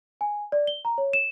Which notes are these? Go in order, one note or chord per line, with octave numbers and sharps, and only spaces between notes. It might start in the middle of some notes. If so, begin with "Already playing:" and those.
G#5
D5
G7
A#5
C#5
E7